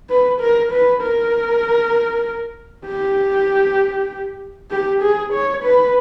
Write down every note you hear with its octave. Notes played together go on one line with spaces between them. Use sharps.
B4
A#4
B4
A#4
G4
G4
G#4
C#5
B4